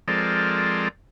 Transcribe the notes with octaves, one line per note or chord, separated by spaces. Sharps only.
F3 G#3 C4 A4 A#4 D5